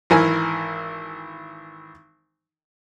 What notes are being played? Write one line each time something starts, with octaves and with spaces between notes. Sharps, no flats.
G#1 E3 A#4 G#5